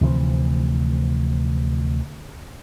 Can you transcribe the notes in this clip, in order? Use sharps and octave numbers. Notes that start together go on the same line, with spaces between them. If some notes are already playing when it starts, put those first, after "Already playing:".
D2 C3 E3 F3